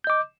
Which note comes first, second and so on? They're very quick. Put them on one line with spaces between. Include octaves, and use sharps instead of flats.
G6 D#5 D6